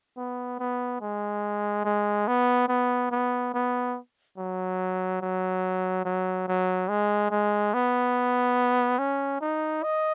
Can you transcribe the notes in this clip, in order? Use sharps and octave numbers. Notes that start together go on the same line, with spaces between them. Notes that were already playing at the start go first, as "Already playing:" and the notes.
B3
B3
G#3
G#3
B3
B3
B3
B3
F#3
F#3
F#3
F#3
G#3
G#3
B3
C#4
D#4
D#5